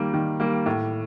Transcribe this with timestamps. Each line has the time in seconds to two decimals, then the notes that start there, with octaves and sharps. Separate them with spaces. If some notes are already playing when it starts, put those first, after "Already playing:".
Already playing: D#3 G3 A#3
0.14 D#3
0.40 G3 A#3
0.66 A2